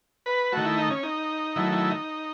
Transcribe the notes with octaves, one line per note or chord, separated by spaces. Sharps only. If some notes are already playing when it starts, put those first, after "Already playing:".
B4
D#3 A3 F#4
E4
D#4
C#4
D#4
D#3 F#3 A3 E4
E4
D#4